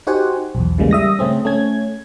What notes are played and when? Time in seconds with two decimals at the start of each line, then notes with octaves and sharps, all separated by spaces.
0.07 D#4 F#4 G4 C5 F#5 G#5
0.55 B1 E2
0.78 C#3 E3 G3 G#3 A#3
0.91 G3 E5 D#6 A#6
1.19 C#3 A3 C4 C#4
1.45 A3 C#4 G#6